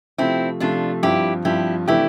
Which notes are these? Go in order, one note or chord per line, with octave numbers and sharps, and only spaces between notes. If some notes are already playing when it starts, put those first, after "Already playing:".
C3 F3 A3 C4 E4
C3 F3 A3 D4 F4
G2 F3 C4 E4 G4
G2 F3 C4 E4 G4
C3 E3 A3 D4 E4 G4